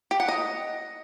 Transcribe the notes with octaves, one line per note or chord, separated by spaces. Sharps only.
G4
F#5
D#5